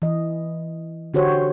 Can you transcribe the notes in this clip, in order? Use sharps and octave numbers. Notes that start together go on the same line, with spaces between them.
E3 D#5
D3 F#4 G4 C5 C#5